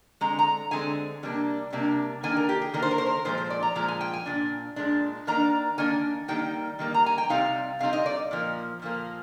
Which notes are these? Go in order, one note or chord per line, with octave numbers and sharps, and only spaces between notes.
D3 G#3 C4 A#5
A#5
D3 G#3 C4 G#5
C3 G3 A#3 D4
C3 G3 A#3 D4
D#3 A#3 D4 G#5
A#4
G4
G#4
D#3 A#3 D4 A#4
C5
A#4
C5
A#4
A#2 F3 G#3 C5
C5
D5
A#5
A#2 F3 G#3 A#5
G#5
G5
G#5
A#2 G#3 D4
A#2 G#3 D4
D#3 A#3 D4 A#5
D#3 A#3 D4 G#5
D#3 G3 A#3 D#4 G5
D#3 G3 A#3 D#4
A#5
G#5
G5
C3 G3 C4 D#4 F5
C3 G3 C4 D#4 F5
D#5
D5
A#2 F3 A#3
A#2 F3 A#3